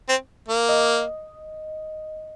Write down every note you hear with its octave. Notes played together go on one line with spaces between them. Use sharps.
C4
A#3
D#5